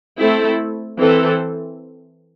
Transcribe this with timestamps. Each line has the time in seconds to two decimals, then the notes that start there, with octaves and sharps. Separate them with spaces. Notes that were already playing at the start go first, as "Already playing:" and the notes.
0.18 A3 C4 E4 A4
0.98 E3 C4 A4